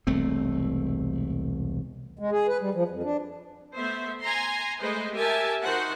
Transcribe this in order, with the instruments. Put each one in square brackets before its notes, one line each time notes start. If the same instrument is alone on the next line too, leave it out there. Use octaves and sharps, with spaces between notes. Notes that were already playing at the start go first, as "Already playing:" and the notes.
[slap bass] E1 C2 A3 C4
[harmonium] G#3
G#4
B4
G3
F3
F2
D4
[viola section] A3 B3 C5 E5
G#5 A#5 C6
G#3 A3 B4 C5 D#5
G4 A#4 E5 G#5 A5
D#3 F#4 C5 F#5